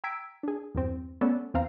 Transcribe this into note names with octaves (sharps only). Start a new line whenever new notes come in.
G5 A#5 E6 G#6 B6 D7
D4 G#4
E2 G2 C4
A3 B3 C#4 A4 D5
E2 C4 F5 A#5